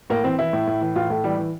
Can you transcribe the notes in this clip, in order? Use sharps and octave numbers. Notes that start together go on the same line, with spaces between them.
A2 A#3
E3 C4
E3 E4
A2
A2
E3
A2 F4
A2 A3
E3 G3
E3